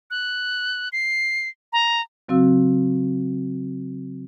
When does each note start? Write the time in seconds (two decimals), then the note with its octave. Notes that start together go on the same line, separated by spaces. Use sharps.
0.11 F#6
0.93 C7
1.73 A#5
2.28 C#3 F#3 C4 F#4 F5 E6